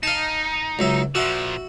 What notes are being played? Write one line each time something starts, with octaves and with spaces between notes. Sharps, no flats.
D#4 F5 A5
C#2 F#3 E5
A#2 F3 F#4 E5 F#5